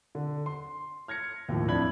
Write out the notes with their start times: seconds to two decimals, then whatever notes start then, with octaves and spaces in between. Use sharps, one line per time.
0.15 D3
0.46 C6
1.08 F6 G#6 A#6 C#7
1.49 D#2 A2 F3
1.68 F2 D4 E4 B5 G#6 F#7